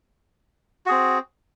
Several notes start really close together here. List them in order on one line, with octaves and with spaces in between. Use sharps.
F#4 G#4 C4